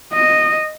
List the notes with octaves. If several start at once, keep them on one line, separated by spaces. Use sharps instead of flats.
D#5